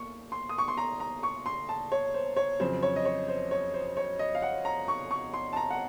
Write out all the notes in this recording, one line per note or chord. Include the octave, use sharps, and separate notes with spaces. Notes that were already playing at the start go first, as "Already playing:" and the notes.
Already playing: A#3 C#6
C6
D#6
C#6
C6
A#5
A#5
C#6
C6
A5
C#5
C5
C#5
F2 C#3 F#3 C5
C#5
D#5
C#5
C5
C#5
C5
C#5
D#5
F5
F#5
A#5
C#6
C#6
C6
A5
A#5
F#5